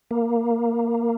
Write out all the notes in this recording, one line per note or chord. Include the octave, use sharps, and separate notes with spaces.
A#3